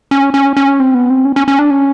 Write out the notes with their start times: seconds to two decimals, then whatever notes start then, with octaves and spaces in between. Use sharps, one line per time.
0.11 C#4
0.34 C#4
0.57 C#4
0.80 C4
0.94 B3
1.10 C4
1.25 C#4
1.36 C#4
1.48 C#4
1.59 D4
1.70 C#4